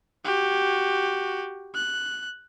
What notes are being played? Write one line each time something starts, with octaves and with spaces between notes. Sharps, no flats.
F#4 G4
F#6